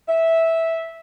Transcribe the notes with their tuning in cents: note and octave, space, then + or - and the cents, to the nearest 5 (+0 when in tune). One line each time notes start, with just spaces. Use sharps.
E5 -10